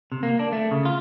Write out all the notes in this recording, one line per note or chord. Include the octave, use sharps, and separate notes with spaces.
C3
A#3
D4
A3
C#3
F4